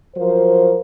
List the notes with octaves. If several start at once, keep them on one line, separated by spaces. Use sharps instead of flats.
F3 F#3 A#4 C5